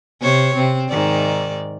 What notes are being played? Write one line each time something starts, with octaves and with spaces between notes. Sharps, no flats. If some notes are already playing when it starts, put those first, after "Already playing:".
C3 C5 C#5
C3 C4
G#2 D#3 D5